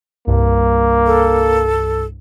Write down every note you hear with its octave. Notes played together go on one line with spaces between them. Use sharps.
C2 G2 A#3
A4